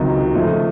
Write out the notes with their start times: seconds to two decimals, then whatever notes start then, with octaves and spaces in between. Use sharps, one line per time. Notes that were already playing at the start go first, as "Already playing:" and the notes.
Already playing: C#2 C3 D#3 F#3
0.34 C#2 C#3 F3 A3